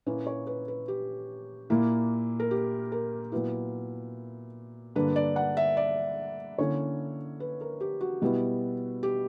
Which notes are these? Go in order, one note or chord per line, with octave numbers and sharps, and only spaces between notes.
A#2 A#3 C#4 E4 B4
C#5
B4
B4
G4
A#2 A#3 E4
A#4
G4
A#4
A#2 F#3 B3 E4 B4
G2 D3 A#3 D4 B4
D5
F#5
E5
D5
D3 A#3 C#4 E4 C#5
B4
A#4
G4
F#4
B2 G3 B3 E4
G4